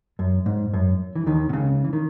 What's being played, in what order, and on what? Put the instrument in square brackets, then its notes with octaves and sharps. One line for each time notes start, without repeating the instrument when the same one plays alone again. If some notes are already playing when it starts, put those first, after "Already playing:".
[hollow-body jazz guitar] F#2
G#2
F#2
E3
D#2 D#3
B2
C#2 C#3
E3
D#3